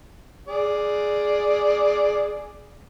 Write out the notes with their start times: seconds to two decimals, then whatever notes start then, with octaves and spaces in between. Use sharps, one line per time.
0.48 G#4 D5